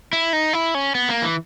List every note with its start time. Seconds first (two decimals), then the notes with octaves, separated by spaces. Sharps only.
0.13 E4
0.33 D#4
0.53 E4
0.74 C#4
0.95 B3
1.09 A#3
1.22 E3